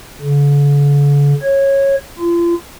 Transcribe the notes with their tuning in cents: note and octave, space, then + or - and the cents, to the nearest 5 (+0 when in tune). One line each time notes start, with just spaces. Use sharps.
D3 -45
C#5 -15
F4 -35